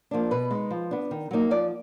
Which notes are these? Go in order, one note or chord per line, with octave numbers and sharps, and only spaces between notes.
F3 A#3 D4
B2 B4
G#3 D#4
F3
B3 D4
D#3
F#3 A#3 D#4
F3 D5